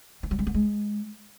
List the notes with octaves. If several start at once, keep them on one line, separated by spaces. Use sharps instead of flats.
E3
F#3
G3
B3
G#3